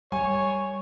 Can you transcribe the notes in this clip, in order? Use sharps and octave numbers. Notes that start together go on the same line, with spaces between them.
G3 C#5 G#5